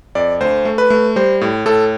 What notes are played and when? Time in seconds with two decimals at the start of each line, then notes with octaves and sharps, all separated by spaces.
0.15 F2 D5
0.40 D2 C5
0.65 A3
0.78 B4
0.90 A3
1.16 G3 C5
1.41 A2
1.66 A2 A4